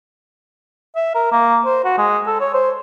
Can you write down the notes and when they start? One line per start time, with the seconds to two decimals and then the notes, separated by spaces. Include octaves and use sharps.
0.96 E5
1.15 A#4
1.32 A#3
1.65 C5
1.85 F#4
1.98 G#3
2.27 A4
2.41 C#5
2.54 C5